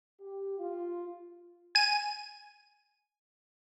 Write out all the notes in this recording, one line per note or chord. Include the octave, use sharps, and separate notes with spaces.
G4
F4
G#5 D#7